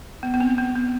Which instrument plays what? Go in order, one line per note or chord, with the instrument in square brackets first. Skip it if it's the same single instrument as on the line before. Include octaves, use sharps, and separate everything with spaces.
[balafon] B3
B3
C4
B3
B3